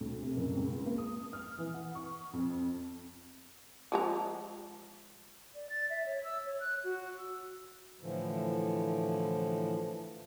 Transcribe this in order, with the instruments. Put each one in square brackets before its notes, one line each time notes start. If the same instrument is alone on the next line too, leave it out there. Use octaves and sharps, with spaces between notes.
[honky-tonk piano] D2
C3
F#1
C#2
A#3
D#6
F6
E3
F#5
C#6
F2
[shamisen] F3 G#3 A#5
[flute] D5
A6
E5
C#5
E6
C#5
F#6
F#4
E6
[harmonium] A2 D3 E3 F3